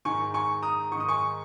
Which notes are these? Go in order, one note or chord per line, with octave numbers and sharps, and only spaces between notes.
G#2 D#3 G#5 C#6
G#5 C#6
A#5 D#6
G#2 D#3 C#6 D#6
G#5 C#6